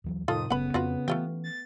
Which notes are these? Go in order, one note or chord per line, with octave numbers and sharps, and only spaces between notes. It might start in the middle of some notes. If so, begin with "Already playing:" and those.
D#2 E3 F#3
F2 A2 C3 D#3 F4 A4 D#6
F#1 C#3 B3 F#5 B5
F2 A#3 C4 F4 F#4 B4
E3 A3 C#4 F4 G4
A6